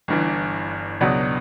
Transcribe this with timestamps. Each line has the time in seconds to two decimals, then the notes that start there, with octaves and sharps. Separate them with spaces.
0.08 G1 G2 E3
1.01 C#2 B2 F#3 B3 D4